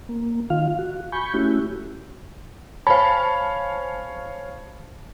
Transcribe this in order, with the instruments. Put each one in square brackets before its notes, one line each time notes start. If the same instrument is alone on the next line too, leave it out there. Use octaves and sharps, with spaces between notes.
[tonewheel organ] A#3
D#3 F4 F5
F#4
G#5 B5 C#6 G6
A3 C#4 E4 F#4 G4
[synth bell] C5 G#5 [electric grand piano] C#5 F5 [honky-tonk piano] A5 [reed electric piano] B5